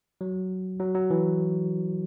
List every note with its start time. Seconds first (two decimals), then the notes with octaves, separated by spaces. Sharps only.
0.21 F#3
0.80 F#3
0.95 F#3
1.10 E3